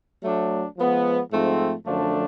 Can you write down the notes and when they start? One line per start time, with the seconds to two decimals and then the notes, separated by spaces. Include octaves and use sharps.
0.22 F#3 A3 D4
0.77 F3 G#3 B3
1.31 G#2 F3 A3 C4
1.86 F#2 D3 F3 A3 D4